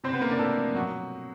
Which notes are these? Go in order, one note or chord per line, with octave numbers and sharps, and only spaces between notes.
C3 C4 C5
B3 B4
C3 A#3 A#4
D4 D5
C3 A3 A4
F3
B2 F#3 F#4